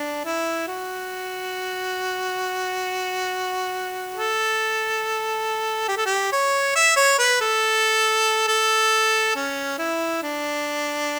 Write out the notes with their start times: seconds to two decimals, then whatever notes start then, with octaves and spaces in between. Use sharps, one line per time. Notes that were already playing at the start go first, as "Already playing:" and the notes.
Already playing: D4
0.25 E4
0.67 F#4
4.14 A4
5.88 G4
5.97 A4
6.06 G4
6.32 C#5
6.76 E5
6.97 C#5
7.19 B4
7.41 A4
8.48 A4
9.36 C#4
9.79 E4
10.22 D4